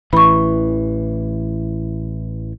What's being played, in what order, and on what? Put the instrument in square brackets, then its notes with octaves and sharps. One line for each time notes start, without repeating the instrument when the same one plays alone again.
[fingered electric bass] A1 E3 [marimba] B5 C#6